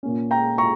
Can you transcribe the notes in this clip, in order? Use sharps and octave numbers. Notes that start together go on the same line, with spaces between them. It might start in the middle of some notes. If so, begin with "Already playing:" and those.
A#2 A#3 C#4
G5 A#5
A#5 C#6